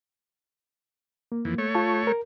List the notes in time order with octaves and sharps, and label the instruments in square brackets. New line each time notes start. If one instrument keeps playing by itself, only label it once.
[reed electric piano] A#3
[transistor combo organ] F2 E3
A3 C#5
[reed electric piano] F4 A5 C#6
A#4